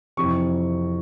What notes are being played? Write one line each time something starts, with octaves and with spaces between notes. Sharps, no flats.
F2 C3 E3 C#6